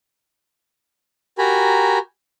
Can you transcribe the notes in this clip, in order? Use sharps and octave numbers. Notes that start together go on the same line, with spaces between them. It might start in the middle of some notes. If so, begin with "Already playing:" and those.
F#4 G4 A#4 G#5 A#5 B5